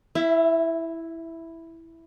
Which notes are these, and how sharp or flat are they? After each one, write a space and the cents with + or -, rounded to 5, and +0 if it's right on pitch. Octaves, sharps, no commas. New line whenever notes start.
E4 +0 E5 +35